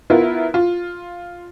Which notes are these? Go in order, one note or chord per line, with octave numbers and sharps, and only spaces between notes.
B3 E4 F4 A#4
F4